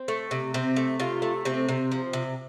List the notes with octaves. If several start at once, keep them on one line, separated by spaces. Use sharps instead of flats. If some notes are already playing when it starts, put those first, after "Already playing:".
Already playing: C4
A3
C3
C3 C4
A3
C3 F4
A3
C3 C4
C3
F3
C3